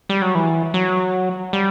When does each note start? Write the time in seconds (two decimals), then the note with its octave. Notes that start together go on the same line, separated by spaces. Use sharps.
0.10 G3
0.22 F#3
0.35 E3
0.74 F#3
1.53 G3